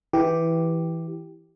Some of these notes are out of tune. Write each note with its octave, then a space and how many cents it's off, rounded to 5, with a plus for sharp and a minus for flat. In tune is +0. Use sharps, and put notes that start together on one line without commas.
E3 +0 G4 +0